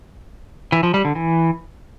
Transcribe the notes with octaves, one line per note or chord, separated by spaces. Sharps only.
E3
F3
G3
D3
E3